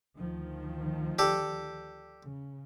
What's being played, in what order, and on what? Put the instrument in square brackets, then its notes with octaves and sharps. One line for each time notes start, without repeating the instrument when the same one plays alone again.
[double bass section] D2 D#3 F3
[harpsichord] G4 A4 D5
[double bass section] C#3